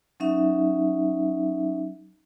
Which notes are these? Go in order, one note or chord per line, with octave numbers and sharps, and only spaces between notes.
F#3 C#4 D#4 E5